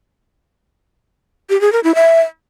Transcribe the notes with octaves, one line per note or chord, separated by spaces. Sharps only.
G4
G#4
A#4
E4
E5